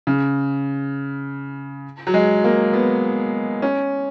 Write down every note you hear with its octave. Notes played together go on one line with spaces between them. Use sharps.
C#3
F#3
G#3
A#3
B3
C#4